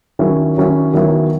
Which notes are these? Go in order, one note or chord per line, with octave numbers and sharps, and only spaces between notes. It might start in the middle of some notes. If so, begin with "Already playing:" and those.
D#3 F#3 C#4 E4
D#3 F#3 C#4 E4
D#3 F#3 B3 E4